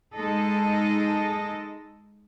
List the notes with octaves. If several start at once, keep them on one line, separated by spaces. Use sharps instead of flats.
G#3 D#4 A4 D#5